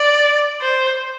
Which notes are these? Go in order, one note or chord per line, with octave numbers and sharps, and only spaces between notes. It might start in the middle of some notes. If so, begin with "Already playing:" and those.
Already playing: D5
C5